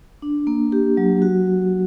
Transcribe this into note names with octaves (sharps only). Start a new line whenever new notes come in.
D4
A#3
G4
F#3
F#4